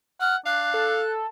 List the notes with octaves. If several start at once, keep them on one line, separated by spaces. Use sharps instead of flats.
F#5 F6
D4 F5 F#6
A4